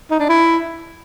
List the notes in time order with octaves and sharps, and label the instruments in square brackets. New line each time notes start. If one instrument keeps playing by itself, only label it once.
[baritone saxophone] D#4
D4
E4